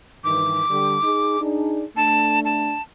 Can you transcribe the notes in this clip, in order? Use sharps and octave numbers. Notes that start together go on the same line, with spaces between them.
G2 D#3 E3 D6
D3 G3 G4
D#4 G#4
D4 D#4 G#4
A3 D4 A5
A5